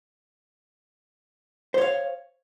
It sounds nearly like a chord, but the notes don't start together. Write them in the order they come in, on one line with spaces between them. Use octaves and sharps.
C5 C#5 F5